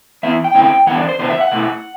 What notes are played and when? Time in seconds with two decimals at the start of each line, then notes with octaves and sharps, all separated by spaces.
0.23 E3 B3 E4 E5
0.44 G5
0.55 D3 A3 C4 E4 G5
0.87 E3 G3 B3 D4 F#5
0.98 D5
1.09 C5
1.19 C3 E3 B3 D4 C5
1.30 E5
1.41 F#5
1.51 B2 A3 E4